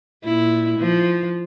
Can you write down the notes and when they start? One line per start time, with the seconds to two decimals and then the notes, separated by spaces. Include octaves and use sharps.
0.24 A#2 E4
0.79 F3